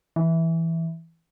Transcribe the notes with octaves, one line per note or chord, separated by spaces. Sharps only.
E3